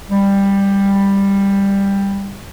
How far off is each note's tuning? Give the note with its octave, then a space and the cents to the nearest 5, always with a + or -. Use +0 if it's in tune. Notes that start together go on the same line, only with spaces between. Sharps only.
G3 +10